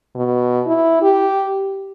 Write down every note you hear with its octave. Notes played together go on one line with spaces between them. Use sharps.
B2
E4
G4